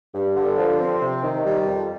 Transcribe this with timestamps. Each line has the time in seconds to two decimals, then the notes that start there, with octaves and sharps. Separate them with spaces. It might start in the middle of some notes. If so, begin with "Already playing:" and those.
0.14 G2
0.35 D3
0.57 F3
0.79 C4
1.02 C3
1.23 D#3
1.46 G3
1.66 F2